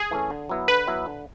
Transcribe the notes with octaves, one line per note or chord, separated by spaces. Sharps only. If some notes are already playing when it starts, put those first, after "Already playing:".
Already playing: G#4
E3 A3 C#4
D3
F#3 B3 E4
D3 B4
F#3 B3 E4
D3